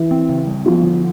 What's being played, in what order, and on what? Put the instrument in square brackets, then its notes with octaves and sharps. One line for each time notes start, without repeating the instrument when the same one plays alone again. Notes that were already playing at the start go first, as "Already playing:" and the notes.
Already playing: [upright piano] E3
[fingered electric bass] C4
C#3
G3
[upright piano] F3 [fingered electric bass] B3
[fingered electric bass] D3